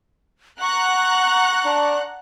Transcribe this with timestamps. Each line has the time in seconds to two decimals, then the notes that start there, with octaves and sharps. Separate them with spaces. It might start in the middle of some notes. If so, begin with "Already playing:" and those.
0.61 F#5 A#5 C#6 F#6
1.64 D4